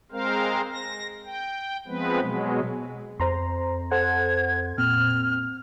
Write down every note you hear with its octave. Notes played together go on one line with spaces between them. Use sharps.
G#3 C4 A#4 C5 F5
A#6
G5
F3 G#3 B3 C4 B4
B2 F#3 G#3
F2 C5 A#5 C6
A4 C5 F#5 G#6
A#2 C4 F6